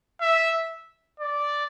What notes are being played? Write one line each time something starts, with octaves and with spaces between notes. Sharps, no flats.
E5
D5